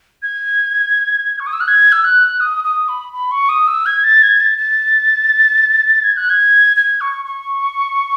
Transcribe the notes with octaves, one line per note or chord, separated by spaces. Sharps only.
G#6
C#6
D#6
E6
F#6
G#6
E6
F#6
D#6
D#6
B5
B5
C#6
D#6
E6
G#6
A6
G#6
A6
A6
G#6
F#6
G#6
G#6
C#6
C#6